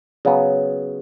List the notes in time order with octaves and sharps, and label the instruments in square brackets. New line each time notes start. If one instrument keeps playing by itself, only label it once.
[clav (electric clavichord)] C#3 F#3 B3